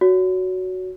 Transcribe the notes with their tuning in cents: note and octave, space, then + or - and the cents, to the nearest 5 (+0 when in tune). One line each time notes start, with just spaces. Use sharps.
F#4 +0 C#5 +30